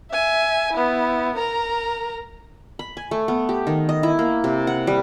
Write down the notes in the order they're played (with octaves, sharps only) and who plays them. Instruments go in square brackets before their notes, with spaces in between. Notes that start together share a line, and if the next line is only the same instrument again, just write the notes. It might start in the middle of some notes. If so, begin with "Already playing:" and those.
[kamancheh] E5 G#5
B3 E4
A#4 A#5
[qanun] B5
G#5
A3
B3
G4
D#3
D#5
E4
A#3
C3
F#5
G3